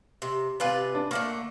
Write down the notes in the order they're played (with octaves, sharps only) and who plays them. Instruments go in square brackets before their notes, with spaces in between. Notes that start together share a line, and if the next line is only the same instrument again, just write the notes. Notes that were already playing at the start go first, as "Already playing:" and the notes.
[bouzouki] C3
[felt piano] C3 G#5 [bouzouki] F4 B4 D5
[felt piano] D4
[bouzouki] D3 A3 A#3 [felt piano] C#6 D6 F6